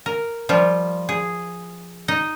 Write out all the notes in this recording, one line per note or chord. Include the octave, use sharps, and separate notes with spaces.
A#4
F3 G3 F4
G#4
D#4 D#5